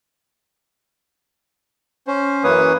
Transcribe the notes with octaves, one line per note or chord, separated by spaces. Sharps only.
C#4 C5
F#2 E3 A#3 B4 C#5 D#6